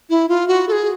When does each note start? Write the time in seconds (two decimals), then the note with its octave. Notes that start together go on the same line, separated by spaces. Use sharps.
0.10 E4
0.29 F4
0.48 F#4
0.68 A4
0.72 G#4